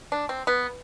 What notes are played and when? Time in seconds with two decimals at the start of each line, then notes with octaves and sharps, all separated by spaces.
0.12 D4
0.29 C4
0.47 B3